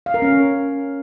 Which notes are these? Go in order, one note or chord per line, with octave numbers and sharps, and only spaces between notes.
F5
A#4
C#4